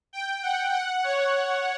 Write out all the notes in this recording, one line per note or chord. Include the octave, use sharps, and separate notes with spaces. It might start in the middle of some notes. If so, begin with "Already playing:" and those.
G5
F#5
F#5
C#5